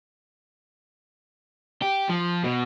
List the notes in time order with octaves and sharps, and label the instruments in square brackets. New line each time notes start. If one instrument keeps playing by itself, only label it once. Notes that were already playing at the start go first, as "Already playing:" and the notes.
[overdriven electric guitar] G4
F3
B2